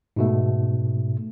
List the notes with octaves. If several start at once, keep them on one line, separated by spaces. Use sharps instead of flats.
G#2 B2 A3